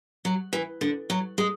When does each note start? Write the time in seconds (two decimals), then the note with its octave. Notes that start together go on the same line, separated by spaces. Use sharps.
0.25 F#3
0.53 E3
0.81 D3
1.10 F#3
1.38 G#3